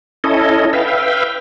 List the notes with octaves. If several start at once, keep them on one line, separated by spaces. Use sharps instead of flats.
C#4 E4 A4 D#5
B4 E5 F5 G5